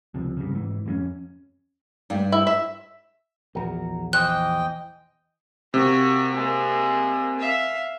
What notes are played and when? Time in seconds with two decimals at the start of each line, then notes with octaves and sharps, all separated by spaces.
0.14 C#2 C3 F3
0.37 G2 C#3
0.52 G#2 E3
0.86 F2 F#3 C#4
2.10 G2 G3
2.32 E4
2.47 E5
3.55 A#1 E2 F#4 A#4
4.13 E3 C5 D#5 G5 F#6
5.74 C3 A#3 F#4
6.33 G#3 A#3
7.38 E5 F5